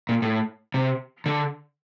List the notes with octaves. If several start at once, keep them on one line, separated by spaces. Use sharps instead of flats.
A#2
A2
C3
D3